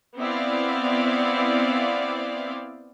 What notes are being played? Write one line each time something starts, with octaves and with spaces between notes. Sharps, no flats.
B3 C4 E4 D5 F5